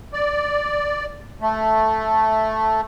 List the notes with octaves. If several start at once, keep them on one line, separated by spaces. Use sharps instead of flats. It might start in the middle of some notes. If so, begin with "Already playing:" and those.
D5
A3